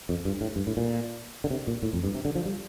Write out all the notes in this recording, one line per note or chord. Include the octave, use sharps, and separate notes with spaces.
F2
G2
A2
G2
A2
A#2
D3
C3
A#2
A2
F2
G2
C3
D3
F3
G3